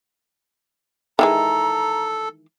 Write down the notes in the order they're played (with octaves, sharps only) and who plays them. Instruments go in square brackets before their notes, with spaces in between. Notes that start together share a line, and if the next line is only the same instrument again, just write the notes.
[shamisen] D#3 E3 G#3 [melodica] A4 [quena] A#5